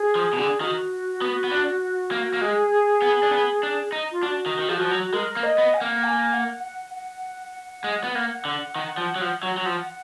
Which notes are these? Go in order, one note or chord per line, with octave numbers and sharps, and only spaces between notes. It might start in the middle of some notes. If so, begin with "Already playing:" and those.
Already playing: G#4
F3
B2
D3
D#3 F#4
B3
B3
D4
A#3
A#3
G#3 G#4
B3
D4
B3
D4
D#4
F4
D4 F#4
D#3
D#3
F3 G#4
F#4
F3
F#3
G#3 A#4
A#3
D#5
B3
G#5
A#3 F#5
A#5
G#5
F#5
F#5
F#5
G#3
B3
A#3
D3
D#3
F3
F#3
F3
F#3
F#3
F3